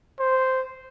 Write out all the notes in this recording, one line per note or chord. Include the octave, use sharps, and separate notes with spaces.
C5